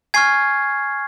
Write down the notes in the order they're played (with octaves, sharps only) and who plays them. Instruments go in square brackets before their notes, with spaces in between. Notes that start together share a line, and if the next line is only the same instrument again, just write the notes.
[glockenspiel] G#5 C#6 F6 G#6 C7